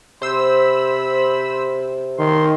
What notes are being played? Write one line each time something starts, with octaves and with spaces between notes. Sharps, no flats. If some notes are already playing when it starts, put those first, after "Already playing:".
C3 C5 B5 E6
D#3 C6